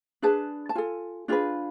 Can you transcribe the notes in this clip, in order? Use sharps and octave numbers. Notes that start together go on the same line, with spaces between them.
D4 G#4 B4 A5
A5
F4 A4 G#5
D4 F4 G#4 B4